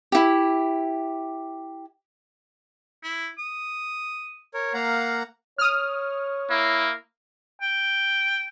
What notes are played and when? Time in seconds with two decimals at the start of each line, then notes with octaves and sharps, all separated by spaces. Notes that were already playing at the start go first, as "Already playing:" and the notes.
0.12 E4 G4
3.03 E4
3.38 D#6
4.54 A#4 C#5
4.74 A#3 F5 F#5 A#5
5.58 C#5 D#6 F6
6.50 A#3 E4
7.62 G5